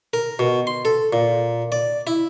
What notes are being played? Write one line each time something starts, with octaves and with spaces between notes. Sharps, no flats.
A#4
B2
C6
A4
A#2
D5
E4